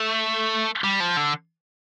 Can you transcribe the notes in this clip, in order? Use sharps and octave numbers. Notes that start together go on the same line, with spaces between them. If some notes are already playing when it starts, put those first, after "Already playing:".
Already playing: A3
G3
F3
D3